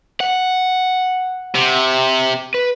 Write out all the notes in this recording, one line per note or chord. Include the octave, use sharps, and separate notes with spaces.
F#5
C3
B4